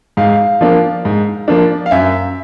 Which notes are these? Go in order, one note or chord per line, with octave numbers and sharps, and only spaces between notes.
G#2 F5
F3 A#3 D4
G#2
F3 A#3 D4
F5
F#2 E5